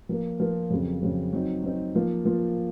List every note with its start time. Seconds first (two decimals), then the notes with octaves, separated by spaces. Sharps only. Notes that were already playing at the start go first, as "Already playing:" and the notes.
0.09 F3 A#3 F4 A#4
0.40 F3 A#3 F4 A#4
0.70 F2 C#3 F#3 C4
1.02 F2 C#3 F#3 C4
1.33 F#3 C4 D#4
1.63 F#3 C4 D#4
1.95 F3 A#3 F4
2.25 F3 A#3 F4